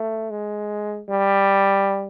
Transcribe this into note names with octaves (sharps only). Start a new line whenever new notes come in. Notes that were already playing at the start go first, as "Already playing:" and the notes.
Already playing: A3
G#3
G3